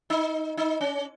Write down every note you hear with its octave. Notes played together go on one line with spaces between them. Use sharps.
D#4
D#4
C#4